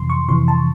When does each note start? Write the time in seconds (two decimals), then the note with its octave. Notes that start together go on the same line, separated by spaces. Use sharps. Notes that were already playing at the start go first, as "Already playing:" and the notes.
Already playing: F2 C3 E3 C6
0.10 C#6
0.29 F2 C3 E3 C6
0.48 A5